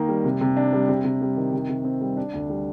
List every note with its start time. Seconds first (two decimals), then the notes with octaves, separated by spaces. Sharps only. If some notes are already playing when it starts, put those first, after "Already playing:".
Already playing: D#3 A#3 D#4
0.09 G3
0.25 C3
0.41 C3
0.57 D4
0.73 G3
0.89 C3
1.04 C3
1.22 G3
1.37 D#3
1.53 C3
1.69 C3
1.84 C4
2.01 G3
2.17 D4
2.33 D2
2.50 G3